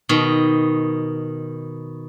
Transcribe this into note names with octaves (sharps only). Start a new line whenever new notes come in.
B2 D#3